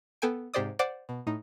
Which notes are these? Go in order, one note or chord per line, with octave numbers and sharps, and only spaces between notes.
B3 A4 G5 G#5 D7
G#2 C3 G4 C5 D5 D#6
C5 D5 F#5 D6
B2
A2 D#4